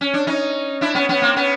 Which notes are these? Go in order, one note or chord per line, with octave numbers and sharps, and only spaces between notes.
C#4
D4
C#4 D#4
D4 E4
B3 C#4
B3 C#4
A#3 C4
B3 C#4